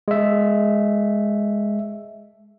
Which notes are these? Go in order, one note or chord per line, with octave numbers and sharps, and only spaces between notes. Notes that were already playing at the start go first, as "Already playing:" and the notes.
G#3 E5